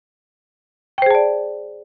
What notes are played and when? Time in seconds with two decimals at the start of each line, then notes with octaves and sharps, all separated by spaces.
0.98 G5
1.02 C5
1.06 G#4
1.11 A5
1.15 D5